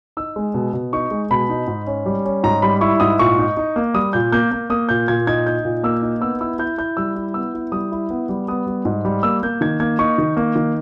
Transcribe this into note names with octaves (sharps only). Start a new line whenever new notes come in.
D#4 E6
G#3
B2
B2
D#4 C#6
G#3
B2 B5
D#4
G#2
C#4
G3
C#4
G#2 A#5
G3 B5
E4 C#6
G#2 D#6
A#2 C#6
D#4
D#4
A#3
G3 D#6
A#2 G6
A#3 G6
A#3
A#3 D#6
A#2 G6
A#2 G#6
D#4 G#6
D#4 G6
A#2
A#3 E6
D#4
B3 E6
E4 E6
E4 G6
E4 G6
G3 E6
E4
B3 E6
E4
G3 D#6
E4
B3
G3
B3 D#6
G3
G#2
G3
A#3 E6
A#3 G6
D#3 G#6
A#3 G#6
D#4 C#6
D#3
A#3
D#3